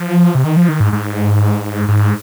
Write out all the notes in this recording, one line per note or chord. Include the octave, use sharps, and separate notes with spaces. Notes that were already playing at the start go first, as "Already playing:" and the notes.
Already playing: F3
C3
D#3
F3
D#3
G#2
G#2
G#2